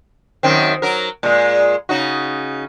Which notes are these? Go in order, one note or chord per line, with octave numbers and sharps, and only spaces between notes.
F#2 D#3 C4
F#3 A#4
A#2 G#3
C#3 D#4 F#4